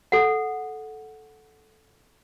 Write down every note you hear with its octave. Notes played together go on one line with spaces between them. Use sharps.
A4 F#5